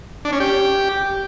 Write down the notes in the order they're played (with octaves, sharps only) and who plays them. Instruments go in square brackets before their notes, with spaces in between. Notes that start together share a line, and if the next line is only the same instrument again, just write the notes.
[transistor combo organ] D4
C#4
G4